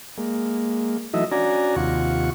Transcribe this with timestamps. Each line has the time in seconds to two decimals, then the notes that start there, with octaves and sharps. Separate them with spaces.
0.18 G#3 A#3
1.14 E3 F#3 A3 D#4 D#5 E5
1.32 C#4 D4 F#4 D5 G#5 A#5
1.76 D#2 C3 F4 F#5 C#6